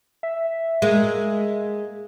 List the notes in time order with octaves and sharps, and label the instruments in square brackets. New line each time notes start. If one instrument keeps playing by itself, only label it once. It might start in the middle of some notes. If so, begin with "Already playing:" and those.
[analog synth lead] E5
[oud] G#3 A#3